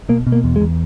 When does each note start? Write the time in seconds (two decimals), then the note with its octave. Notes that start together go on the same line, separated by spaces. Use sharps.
0.09 B2 A#3
0.27 B2
0.32 A#3
0.44 E2
0.56 G#3
0.61 E2